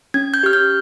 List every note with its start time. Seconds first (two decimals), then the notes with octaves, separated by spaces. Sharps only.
0.14 C#4 G#6
0.34 G6
0.43 G4 F6
0.53 G6